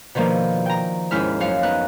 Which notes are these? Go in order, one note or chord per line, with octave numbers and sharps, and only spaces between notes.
B2 D#3 F3 A#3 D4
G5 A#5
D#2 G#2 C#4 E4 E5 F6
F#2 C#5 F5
B3 D#4 F#6